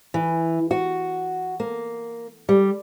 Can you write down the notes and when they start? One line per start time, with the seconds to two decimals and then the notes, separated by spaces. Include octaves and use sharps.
0.14 E3
0.71 F#4
1.60 A#3
2.49 G3